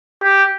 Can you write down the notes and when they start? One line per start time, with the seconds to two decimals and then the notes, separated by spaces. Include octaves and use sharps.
0.23 G4